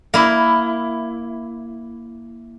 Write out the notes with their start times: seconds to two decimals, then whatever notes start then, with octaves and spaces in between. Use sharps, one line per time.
0.14 A#3 E4